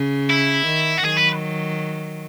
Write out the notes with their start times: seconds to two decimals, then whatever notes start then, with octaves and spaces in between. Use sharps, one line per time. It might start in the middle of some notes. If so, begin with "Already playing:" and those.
Already playing: C#3
0.30 E4
0.66 D#3
0.98 F#4
1.04 D#3 F#3 G#4
1.17 B4